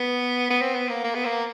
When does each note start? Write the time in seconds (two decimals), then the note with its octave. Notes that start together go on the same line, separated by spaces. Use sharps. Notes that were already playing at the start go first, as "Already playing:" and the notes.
Already playing: B3
0.50 B3
0.61 C4
0.75 B3
0.89 A#3
1.04 A#3
1.15 B3
1.25 A#3